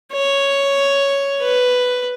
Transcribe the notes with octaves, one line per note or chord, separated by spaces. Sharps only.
C#5
B4